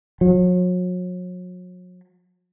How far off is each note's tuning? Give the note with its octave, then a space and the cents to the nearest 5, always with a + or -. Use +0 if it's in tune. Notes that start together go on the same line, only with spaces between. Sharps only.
F#3 -40